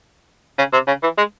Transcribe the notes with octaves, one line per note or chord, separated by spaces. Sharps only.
C#3
C3
C#3
E3
G#3